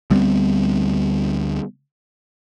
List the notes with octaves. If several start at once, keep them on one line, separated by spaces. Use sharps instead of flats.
D2 G3 B3 C4